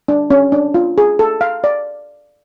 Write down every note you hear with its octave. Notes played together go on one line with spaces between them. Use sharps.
D4
C#4
D4
F4
G#4
A4
F5
D5